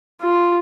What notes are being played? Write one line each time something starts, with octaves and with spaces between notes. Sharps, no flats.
F4